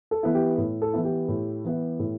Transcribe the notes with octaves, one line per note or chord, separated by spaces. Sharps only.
A4
E3 B3 E4
G4
A2
A4
E3 B3 E4
G4
A2
E3 B3 E4
A2